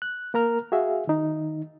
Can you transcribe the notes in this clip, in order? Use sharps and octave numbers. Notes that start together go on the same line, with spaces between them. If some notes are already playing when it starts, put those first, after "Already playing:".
F#6
A#3 A#4 A#5 F6
F#4 G#4 E5 F5
D#3 D#4